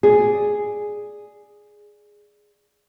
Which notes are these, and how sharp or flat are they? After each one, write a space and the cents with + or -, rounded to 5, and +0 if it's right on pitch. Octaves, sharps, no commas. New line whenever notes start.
G#4 +0 D5 +0